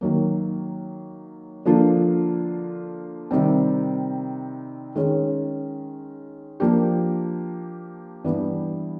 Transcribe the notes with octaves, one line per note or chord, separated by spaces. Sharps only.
D#3 F#3 A#3
D3 F3 A#3 D4 F4
C3 D#3 G3 C4
D#3 G#3 C#4
F3 A#3 D4 G4
G2 E3 G3 B3